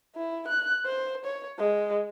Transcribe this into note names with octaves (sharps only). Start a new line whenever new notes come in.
E4
F#6
C5
C#5
G#3